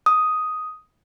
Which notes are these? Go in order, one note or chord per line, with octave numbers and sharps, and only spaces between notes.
D#6